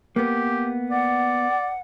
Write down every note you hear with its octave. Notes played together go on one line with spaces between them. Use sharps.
A#3 B3 G4
D5 F#5